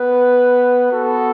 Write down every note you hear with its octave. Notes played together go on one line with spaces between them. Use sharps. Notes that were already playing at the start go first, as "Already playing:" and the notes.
Already playing: B3 B4
B3 F#4 A4